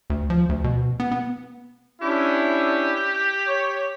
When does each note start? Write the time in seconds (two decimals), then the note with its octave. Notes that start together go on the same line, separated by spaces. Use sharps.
0.10 D2
0.30 F3
0.49 D2
0.64 B2
1.00 B3
1.11 B3
2.02 C#4 D4 E4 G4
3.48 C#5